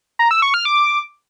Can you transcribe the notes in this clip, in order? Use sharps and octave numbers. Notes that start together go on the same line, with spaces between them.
A#5
E6
C#6
F6
D6